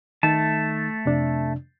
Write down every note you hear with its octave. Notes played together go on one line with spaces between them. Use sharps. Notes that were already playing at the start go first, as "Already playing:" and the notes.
D#3 A3 D#4 A5
F2 C3 D4